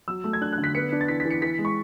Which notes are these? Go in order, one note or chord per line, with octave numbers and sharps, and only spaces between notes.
F#3 E6
A3
G#6
D4 F#6
F#6
D3
B6
B3 C#7
D4
A6
E3 B6
B6
E3
C#7
E3 B6
G#3
C#6